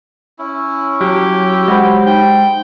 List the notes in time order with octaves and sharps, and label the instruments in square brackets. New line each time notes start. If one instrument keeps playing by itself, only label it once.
[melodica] C#4 E4
[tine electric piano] F#3 [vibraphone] F#4 [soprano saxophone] G4
[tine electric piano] G#3 C5 [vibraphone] F#5 B5
[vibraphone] D#4 [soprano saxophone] G5